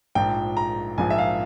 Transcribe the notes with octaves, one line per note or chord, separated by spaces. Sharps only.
A#1 G#2 F3 G5
A#5
A#1 G#2 F3 G#5
E5
F5